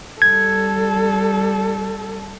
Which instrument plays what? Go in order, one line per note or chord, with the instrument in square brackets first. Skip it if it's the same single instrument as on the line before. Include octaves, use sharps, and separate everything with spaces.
[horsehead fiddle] G3 A4 [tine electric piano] G#6